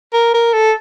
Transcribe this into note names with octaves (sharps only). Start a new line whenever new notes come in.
A#4
A#4
A4